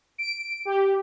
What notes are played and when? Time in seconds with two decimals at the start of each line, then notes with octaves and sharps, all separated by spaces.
0.18 D7
0.65 G4